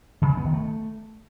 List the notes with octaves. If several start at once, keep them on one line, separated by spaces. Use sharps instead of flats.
C#3
G#3
B3
D#3
A3